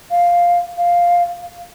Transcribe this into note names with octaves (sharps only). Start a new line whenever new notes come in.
F5
F5